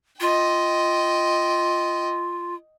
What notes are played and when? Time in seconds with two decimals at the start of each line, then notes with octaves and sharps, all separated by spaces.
0.20 F4 D#5 G5